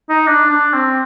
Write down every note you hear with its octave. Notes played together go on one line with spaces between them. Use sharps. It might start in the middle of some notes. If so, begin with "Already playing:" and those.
D#4
D4
D4
C4